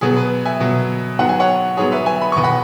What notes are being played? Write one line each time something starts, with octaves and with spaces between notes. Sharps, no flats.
B2 F#3 B3 G#4
B4
E5 G#5
B2 F#3 B3
G#2 F#3 B3 F#5
G#5
C#5 F#5
G#2 F#3 B3 G#4 C#5
B4 E5
E5 G#5
B5
E2 B2 B3 C#6
F#5 B5